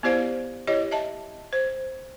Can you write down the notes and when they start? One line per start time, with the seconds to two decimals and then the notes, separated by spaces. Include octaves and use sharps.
0.03 B3 E4 G4 C5 D5 F5
0.67 E4 G4 C#5 D#5
0.91 D#5 E5 A5
1.53 C5